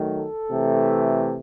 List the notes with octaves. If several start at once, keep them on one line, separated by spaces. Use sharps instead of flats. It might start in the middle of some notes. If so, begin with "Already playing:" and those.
Already playing: D#3 F#3 A3
A4
C3 E3 A3